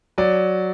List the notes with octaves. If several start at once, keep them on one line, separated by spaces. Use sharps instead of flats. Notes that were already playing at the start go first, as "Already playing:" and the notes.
F#3 D5